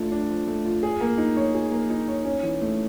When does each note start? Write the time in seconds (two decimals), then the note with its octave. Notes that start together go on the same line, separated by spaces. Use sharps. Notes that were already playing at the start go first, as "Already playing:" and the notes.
Already playing: F3 A3 D4 F4
0.12 D4
0.29 F3
0.47 A3
0.65 F4
0.83 G#4
1.01 A#3
1.18 D#4
1.36 C#5
1.55 G#4
1.72 A#3
1.90 D#4
2.08 C#5
2.25 C#4
2.43 E3
2.61 A3